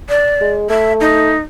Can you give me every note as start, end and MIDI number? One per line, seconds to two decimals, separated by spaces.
0.09 0.51 74
0.41 0.69 56
0.70 1.33 57
0.70 0.93 76
1.01 1.40 63